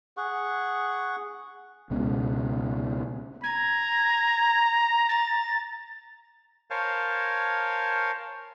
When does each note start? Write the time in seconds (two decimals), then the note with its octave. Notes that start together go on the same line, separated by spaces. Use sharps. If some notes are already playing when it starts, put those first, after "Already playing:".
0.17 G#4 F#5 C#6
1.90 C#2 B2 G#3 C#4
3.44 A#5 G#6
5.09 A6
6.71 A#4 C5 C#5 F5 G#5 A5